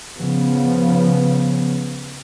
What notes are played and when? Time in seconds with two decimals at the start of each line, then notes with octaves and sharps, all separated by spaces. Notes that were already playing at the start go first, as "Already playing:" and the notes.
0.18 C#3 F3 B3